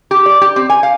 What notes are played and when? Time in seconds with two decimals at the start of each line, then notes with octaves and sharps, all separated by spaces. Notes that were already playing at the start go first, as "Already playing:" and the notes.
0.11 G4
0.26 D5
0.41 G4
0.56 C4
0.69 G#5
0.83 F5